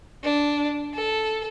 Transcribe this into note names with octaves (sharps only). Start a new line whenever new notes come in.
D4
A4